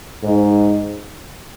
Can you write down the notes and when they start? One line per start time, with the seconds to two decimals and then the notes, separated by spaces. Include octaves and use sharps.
0.23 G#2